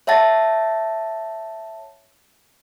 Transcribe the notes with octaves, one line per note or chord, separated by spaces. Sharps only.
C#5 E5 F#5 A5 A6 A#6